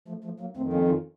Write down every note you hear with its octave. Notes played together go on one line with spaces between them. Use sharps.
F3 A3
F3 A3
F#3 A#3
F2 D#3 A3 C4
A#3 C#4
C#4 F4